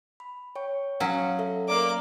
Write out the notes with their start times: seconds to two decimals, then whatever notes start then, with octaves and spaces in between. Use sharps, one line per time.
0.20 B5
0.56 C#5 G5 C#6
1.00 F#3 C#4 F5 F#5 D#6
1.39 A4 E5
1.68 A#3 D5 A#5 D6 F6